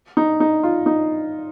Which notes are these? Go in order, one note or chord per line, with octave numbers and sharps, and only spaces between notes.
D#4
D#4
F4
D#4